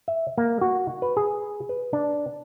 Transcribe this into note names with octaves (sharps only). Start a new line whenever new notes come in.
E5
A#3
F#4
B4
G#4
B4
D4